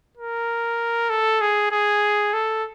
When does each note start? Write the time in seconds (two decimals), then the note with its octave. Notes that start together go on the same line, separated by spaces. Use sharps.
0.18 A#4
1.10 A4
1.41 G#4
1.71 G#4
2.33 A4